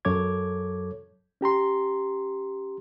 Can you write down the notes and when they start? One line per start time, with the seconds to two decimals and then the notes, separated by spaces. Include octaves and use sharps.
0.05 F#2 F#3 A4 C#5 D6 G#6
1.41 C#4 G4 A#5 C6